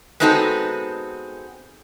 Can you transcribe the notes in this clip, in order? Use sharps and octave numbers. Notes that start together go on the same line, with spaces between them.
G#3 B3 C4 D#4 F#4 A4